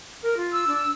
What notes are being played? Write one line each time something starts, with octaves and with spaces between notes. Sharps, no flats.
A#4
F4
E6
D4